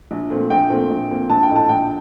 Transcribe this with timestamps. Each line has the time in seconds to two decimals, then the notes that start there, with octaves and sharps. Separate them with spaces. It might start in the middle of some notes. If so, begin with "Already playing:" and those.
0.11 A#1
0.30 A#2 A3 C4
0.50 A#1 G5
0.70 A#2 A3 C4
0.90 A#1
1.09 A#2 A3 C4
1.30 A#1 A5
1.43 G5
1.49 A2 A3 D#4
1.56 A5
1.69 A#1 G5